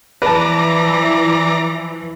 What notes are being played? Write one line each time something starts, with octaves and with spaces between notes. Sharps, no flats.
E3 F3 B4 D5 A5 A#5